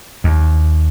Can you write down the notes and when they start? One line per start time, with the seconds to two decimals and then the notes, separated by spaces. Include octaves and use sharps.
0.24 D#2